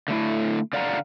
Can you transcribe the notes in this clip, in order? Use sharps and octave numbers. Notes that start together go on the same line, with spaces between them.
D3 A3 E4
D3 D5 F5 F#5 A#5